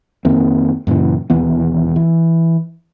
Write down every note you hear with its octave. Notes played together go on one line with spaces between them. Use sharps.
F2 D#3 A#3 C4
F#2 A#2 C#3 E3
E1 D#2 E3 B3
E3